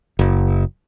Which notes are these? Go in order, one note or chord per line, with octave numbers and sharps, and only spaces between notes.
F#1